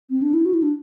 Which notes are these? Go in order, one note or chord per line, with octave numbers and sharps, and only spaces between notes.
C4
D4
E4
F#4
E4
D4